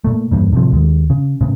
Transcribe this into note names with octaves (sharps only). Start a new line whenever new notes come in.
A#2 A3
E2 G2 A#2
A2 C3 F3
D#2 G#3
C#3
A2 C#3